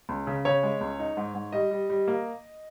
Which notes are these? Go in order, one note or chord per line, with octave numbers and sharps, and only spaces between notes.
C#2
C#3
C#3 C#5
G#3
C#2
D#4
G#2
G#2
G3 D#5
G3
G3
A#3